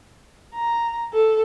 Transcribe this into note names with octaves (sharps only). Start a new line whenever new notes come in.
A#5
A4